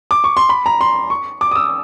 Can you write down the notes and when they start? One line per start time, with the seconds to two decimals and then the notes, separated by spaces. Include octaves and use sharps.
0.11 D6
0.24 C#6
0.37 C6
0.49 B5
0.66 A#5
0.81 C6
1.10 C#6
1.41 D6
1.51 D#6
1.56 E6